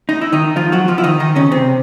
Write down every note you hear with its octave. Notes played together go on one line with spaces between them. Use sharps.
D#4
E4
D#3 D#4
F3 F4
F#3 F#4
F3 F4
E4
D#3 D#4
D#3 D#4
C#3 C#4
C3 C4